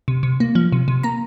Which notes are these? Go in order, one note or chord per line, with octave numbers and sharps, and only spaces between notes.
C3
C3
A#3
F3
C3
C3
A#3 A#5